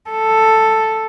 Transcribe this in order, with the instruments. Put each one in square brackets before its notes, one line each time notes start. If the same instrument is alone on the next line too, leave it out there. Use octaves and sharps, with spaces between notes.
[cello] A4